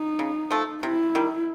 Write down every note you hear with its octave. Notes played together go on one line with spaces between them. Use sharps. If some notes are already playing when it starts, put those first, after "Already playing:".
Already playing: D#4
C#3
F3 A3
C3 E4
D#3 G3